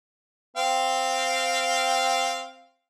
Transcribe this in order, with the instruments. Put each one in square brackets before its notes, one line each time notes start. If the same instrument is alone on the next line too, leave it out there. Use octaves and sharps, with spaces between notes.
[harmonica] C4 F5 G5